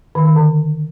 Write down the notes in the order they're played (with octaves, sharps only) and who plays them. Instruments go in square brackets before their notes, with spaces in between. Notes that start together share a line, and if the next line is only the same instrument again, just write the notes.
[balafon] D#3
D#3
D3